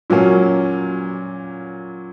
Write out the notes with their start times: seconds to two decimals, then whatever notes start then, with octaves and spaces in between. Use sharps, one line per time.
0.10 A#2 F#3 A#3 C#4